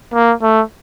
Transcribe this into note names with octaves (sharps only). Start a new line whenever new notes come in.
A#3
A3